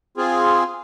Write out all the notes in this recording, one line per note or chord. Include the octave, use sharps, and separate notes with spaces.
C4 F4 G#4